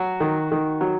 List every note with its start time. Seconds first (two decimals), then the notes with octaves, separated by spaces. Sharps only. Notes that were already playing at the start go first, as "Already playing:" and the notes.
Already playing: F#3 F#4
0.20 D#3
0.51 D#3
0.81 F#3